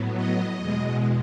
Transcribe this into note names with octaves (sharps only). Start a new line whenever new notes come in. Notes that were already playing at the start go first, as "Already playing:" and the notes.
Already playing: A2 F#3 B3
D#5
E2 B2 G#3